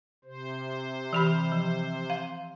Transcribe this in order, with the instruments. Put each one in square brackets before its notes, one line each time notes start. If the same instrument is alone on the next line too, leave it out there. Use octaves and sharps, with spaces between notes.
[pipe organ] C3 C5
[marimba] E3 G4 B5
F3
F5